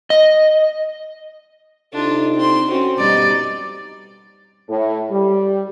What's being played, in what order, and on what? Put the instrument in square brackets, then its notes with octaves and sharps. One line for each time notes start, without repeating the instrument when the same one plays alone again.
[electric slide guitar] D#5
[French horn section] C3 D#4 A4 [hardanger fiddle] D4 F4
[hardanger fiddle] C4 C6
[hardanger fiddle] C4 C#4 [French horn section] F#4
[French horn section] F2 B2 G3 [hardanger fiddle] D#4 [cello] D5
[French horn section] A2
G3